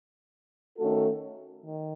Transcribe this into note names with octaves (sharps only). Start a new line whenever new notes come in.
D#3 A3 C#4 F#4 A4
D#3